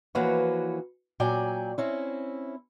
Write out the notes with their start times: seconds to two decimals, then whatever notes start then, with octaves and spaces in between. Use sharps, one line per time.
0.15 E3 F3 A#3 F#4 B4 C#5
1.20 A#2 F#3 D5 G5 G#5
1.78 C4 C#4 E4